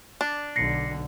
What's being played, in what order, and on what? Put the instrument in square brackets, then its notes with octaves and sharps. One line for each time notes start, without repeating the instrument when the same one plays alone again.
[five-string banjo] D4
[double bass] B1 D3 [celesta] A#6 C7 C#7